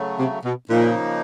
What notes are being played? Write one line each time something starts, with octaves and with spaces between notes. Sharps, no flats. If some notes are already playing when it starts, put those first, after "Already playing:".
Already playing: C#3 F#3 A3
C3
B2
A#2 C#3 F3 A#3 D#4